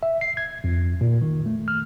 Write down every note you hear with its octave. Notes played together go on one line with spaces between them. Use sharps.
E5
C7
G#6
F2
A#2
D#3
A3
F6